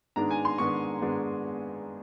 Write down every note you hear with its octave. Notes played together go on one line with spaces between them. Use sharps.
G#2 D#3 G#3 B3 D4 A#5
G#5
C6
G#2 D#3 G#3 B3 D4 C#6
G#2 D#3 G#3 B3 D4